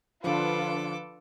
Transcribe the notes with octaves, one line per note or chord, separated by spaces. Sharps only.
D3 F3 D4 F4 A4 B4 D6